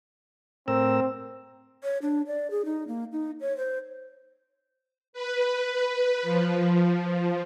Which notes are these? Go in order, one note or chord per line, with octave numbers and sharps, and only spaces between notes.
A2 C4 A#4 E6
C#5
D4
D5
G#4
D#4
A#3
D#4
C#5
C5
B4
F3